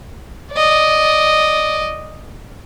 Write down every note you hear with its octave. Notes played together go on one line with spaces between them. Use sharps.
D5 D#5